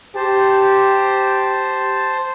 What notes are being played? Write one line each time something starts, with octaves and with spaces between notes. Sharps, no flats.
G4 C5 A5